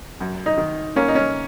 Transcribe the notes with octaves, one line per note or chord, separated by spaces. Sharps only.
F#2
D#4
D#3
A#3 C#4
D#4
C#4